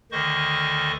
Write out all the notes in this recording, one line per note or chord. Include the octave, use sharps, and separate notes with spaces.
D2 D3 D#3 C5 D#5 C#6